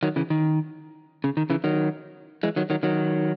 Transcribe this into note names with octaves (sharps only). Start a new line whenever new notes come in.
D#3 F#3
C#3 E3
D#3
C#3
D#3
C#3 E3
D#3 F#3
E3 G#3
D#3 F#3
D#3 F#3
D#3 F#3